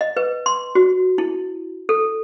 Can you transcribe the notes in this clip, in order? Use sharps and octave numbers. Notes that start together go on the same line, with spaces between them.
D#5
B4
C6
F#4
E4
A4